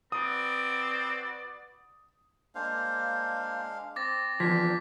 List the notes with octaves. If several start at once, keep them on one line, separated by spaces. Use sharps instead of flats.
C4 F#4 B4 D5 D#6
G#3 A#3 D4 C5 F5
C4 D6 A6 A#6
E2 F3 C4 D4 G#6 B6